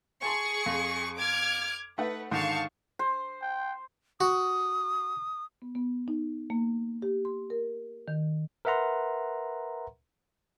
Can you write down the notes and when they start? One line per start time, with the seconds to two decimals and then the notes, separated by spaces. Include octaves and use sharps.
0.22 G#4 G#5 A5 C6 C#6
0.66 F2
1.18 D6 F6 G#6
1.98 A3 D#4 B4 F#5
2.31 G#2 D3 D#3 F5 A5 C#6
2.99 C5
3.42 G5
4.21 F#4 D#6
5.62 B3
5.75 B3
6.08 D#4
6.50 A#3
7.02 G4
7.25 C6
7.50 A#4
8.08 D#3
8.65 A#4 B4 E5 F#5 A#5 C6